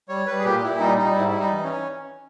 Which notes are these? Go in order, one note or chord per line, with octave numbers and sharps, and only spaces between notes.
G3 C#5
G3 B4
G#4
A#2 G4
A#2 E4
G3 D#4
G3 D#4
G#2 E4
G3 E4
D#4
E3
C#4